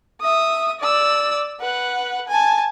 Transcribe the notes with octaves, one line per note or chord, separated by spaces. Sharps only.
E5 D#6
D5 E6
B4 F#5
G#5 A5